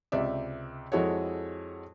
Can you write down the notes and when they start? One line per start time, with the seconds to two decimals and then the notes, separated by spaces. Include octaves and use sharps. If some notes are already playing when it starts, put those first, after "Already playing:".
0.12 C#2 C3 D5 E5
0.92 F2 G#3 E4 F#4 A4 C#5